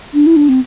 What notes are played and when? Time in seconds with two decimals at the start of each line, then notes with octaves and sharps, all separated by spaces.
0.14 D4
0.26 E4
0.36 D4
0.49 C4